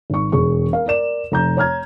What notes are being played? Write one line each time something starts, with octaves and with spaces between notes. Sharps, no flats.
G#1 C#6
E1 G#4 C#6
A#4 F5
A#4 D5 E7
F1 A#5 G6
C#5 A#5 F6 G#6